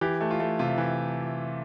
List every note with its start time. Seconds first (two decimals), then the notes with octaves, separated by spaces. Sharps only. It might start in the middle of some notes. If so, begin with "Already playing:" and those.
0.01 E3 G4
0.21 A3
0.31 F4
0.40 A3
0.59 C3 F4
0.78 E3